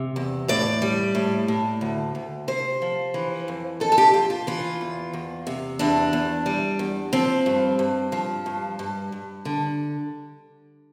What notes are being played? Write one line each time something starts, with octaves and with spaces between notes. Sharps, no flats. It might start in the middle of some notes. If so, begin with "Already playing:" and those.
Already playing: C3
E2
A2 D5
G3
A2
A2
D2
D2
C3 C5
F3
E3
F2
F2 A4
A4
G4
F2 F4
F4
E3 F4
E2
E2
C3
E2 D4
E2
G3
E2
F3 C4
G2
G2
F3
G2
G2
G2
D3